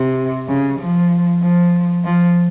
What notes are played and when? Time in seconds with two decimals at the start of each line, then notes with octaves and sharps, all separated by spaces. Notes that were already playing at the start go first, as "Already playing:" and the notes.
Already playing: C3
0.48 C#3
0.80 F3
1.42 F3
2.05 F3